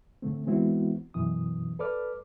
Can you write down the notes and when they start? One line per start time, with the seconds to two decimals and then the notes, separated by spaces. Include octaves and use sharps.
0.22 A2 D3 A3 C4
0.46 E3 G#3 B3 C4 E4 F#4
1.14 F#2 B2 E3 D#6
1.79 A4 B4 D5 D6 F6